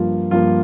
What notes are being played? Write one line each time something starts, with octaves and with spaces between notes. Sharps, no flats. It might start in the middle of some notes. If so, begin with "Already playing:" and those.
Already playing: G2 F3 A#3 F4
G2 F3 A#3 F4